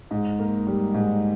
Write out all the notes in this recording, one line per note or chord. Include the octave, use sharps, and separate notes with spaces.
G#2
A#3
G3
G#2